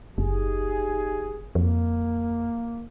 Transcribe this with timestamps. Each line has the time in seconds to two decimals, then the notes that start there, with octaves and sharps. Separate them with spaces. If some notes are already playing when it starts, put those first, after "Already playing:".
0.18 F#1 D#4 G4 G#4
1.55 F2 A#3